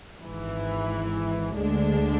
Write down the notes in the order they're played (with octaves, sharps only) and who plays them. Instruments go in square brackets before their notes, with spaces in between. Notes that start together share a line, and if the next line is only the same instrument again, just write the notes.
[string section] G#1 G#2 E3
D2 D3 G#3 D4